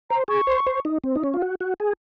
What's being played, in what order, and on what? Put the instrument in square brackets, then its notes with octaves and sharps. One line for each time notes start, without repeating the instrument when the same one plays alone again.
[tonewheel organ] C5 [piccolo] A#5
[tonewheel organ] G#4 [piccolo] C#6
[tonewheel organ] C5
C5
D#4
C4
D#4
C#4
F4
F#4
F#4
G#4